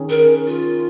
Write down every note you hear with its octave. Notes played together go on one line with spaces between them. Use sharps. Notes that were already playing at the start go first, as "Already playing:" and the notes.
Already playing: D#3 C#4 G#4
A#4
F4